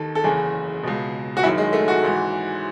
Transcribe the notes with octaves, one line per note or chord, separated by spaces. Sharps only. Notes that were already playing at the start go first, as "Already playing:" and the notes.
Already playing: D#2 D#3 A4
A4
F#1 E2 C#3 G#4
C#2 B2
F#4
F#1 F#2 D#3 E4
G#3
A3
F#4
G#1 G#2 E3